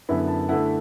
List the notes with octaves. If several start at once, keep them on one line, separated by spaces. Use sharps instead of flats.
F#2 D3 B3 E4 B5
A5
D3 A3 E4 F#5